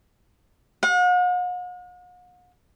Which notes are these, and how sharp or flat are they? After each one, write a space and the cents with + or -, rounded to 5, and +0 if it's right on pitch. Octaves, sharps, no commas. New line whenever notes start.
F#5 -45